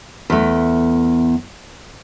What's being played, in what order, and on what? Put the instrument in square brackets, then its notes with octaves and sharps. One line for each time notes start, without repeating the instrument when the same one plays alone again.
[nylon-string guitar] E2 A3